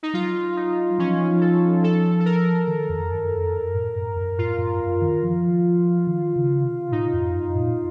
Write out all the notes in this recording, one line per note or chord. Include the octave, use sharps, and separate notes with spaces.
D#4
F#3 F4
D#4
F3 C#4
F#3
F3
A4
A4
A4
A#4
D#3
F2
F#2
F2
F#2
A2
F#2
F#2
A2 F4
F#2
F#2
D#3
F3
D#3
C#3
C3
A2 D#4
F2
F#2
A#2